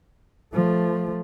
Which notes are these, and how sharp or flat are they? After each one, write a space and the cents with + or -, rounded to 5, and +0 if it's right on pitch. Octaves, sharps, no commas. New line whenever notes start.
F3 +0 A3 +0